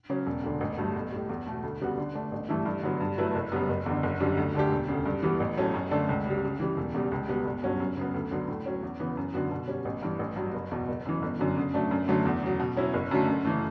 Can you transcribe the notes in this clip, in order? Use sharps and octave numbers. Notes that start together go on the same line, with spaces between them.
C#3 F#3 C#4
E1
D2 D3
A1
G2 F#3 A3
B1
A2 G3
E2
B2 A3
D2
C#3 G3 B3 F#4
D3
A3 D4
A1
G2 E3 A3 E4
G2
D3 F#3 B3
G2
F#3 A3 E4 B4
F#1
F#2 C#3 G3 B3
F#1
E2 D3
F#1
F#2 D3 G3 D4
D2
D3 A3 D4 G4
E1
D2 C#3
G2
E3 G3 B3
A1
A2 F#3 A3 C#4
F#2
D3 A3 D4 A4
C#2
C#3 G3
C#3
E3 G3
E1
E2 C#3 G3
C#2
B2 G3 B3
G1
G2 F#3 C#4 F#4
F#2
C#3 F#3 B3
D2
D3 F#3 B3
A2
F#3 C#4
E2
C#3 E3 B3
F#2
D3 F#3 B3 F#4
B2
G3 C#4
A1
G2 E3
A1
G2 F#3
F#1
E2 B2
F#1
F#2 E3
G1
F#2 D3 F#3
C#3
F#3 A3 D4
F#2
D3 F#3 A3
E2
C#3 F#3
B2
F#3 C#4 E4
F#1
F#2 D3 F#3 A3
F#2
C#3 E3 A3